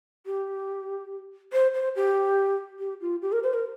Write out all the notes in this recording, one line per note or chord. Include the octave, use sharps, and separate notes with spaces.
G4
C5
C5
G4
G4
F4
G4
A#4
C5
A#4